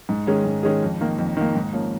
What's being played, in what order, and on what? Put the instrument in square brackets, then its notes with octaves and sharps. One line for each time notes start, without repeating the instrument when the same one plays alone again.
[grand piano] G#2
D#3 G#3 C#4 G#4
G#2
D#3 G#3 C#4 G#4
F2
D#3 A#3
F2
D#3 A#3
G#2
F3 A#3 C#4